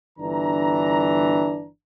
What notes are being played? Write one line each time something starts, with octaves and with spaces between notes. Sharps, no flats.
G1 E3 D4 A#5